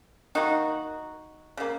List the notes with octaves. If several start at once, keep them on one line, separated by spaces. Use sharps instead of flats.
D#3 A#3 D#4 F#4
C#3 F#3 A#3